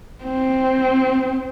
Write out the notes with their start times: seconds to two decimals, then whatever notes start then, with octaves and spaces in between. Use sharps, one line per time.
0.24 C4